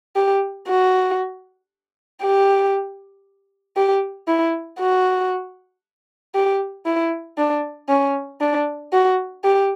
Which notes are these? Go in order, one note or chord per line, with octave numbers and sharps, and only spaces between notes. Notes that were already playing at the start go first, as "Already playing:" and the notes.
G4
F#4
G4
G4
E4
F#4
G4
E4
D4
C#4
D4
F#4
G4